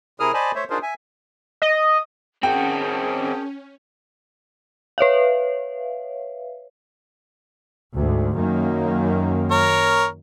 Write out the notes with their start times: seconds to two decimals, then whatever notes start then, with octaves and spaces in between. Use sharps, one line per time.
0.20 C3 E4 G#4 A#4 D#6 F6
0.34 C5 D5 D#5 G#5 A5 B5
0.55 A3 C5 C#5 E5
0.70 D4 D#4 F4 G#4 A#4 C5
0.83 E5 G#5
1.62 D#5
2.43 C4 C#4 F#4 G#4 A#4 G5 A5
4.98 B4 C#5 E5 F5
7.93 D2 G#2
8.36 F#2 D#3 A#3
9.51 A#4 C#5